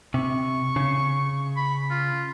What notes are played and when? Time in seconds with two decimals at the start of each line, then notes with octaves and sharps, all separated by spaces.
0.14 C3 C#6
0.76 C#3
1.57 B5
1.91 F4